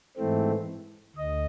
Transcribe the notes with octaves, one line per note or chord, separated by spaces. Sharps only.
G#2 E3 A3 C4
D2 D#5